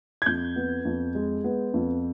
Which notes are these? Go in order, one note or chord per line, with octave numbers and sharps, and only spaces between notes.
G#6
F2 G6
B3
F2
G#3
B3
F2